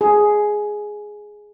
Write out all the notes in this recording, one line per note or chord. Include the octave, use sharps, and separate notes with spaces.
G#4